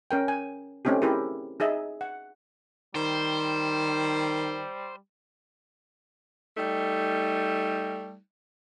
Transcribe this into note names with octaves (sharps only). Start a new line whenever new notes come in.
C#4 A#4 G5
G#5
A3 C4 C#4 D#4 G4
E4 G4 G#4 A#4
D#4 G#4 D#5 E5
F#5
D#3 G3 C5
G3 A3 D#4